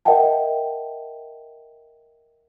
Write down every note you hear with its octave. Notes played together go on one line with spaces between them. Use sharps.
A#4 D#5 E5 F#5 G5 A5